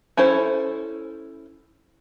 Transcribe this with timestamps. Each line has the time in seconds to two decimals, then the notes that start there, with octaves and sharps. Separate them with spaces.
0.17 C#4 E4 A4 C5